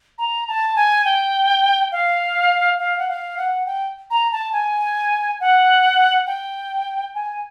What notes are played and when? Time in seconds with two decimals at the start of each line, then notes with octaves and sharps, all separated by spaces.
0.18 A#5
0.48 A5
0.76 G#5
1.05 G5
1.92 F5
2.79 F5
2.98 F#5
3.09 F5
3.38 F#5
3.66 G5
4.11 A#5
4.32 A5
4.53 G#5
5.40 F#5
6.27 G5
7.15 G#5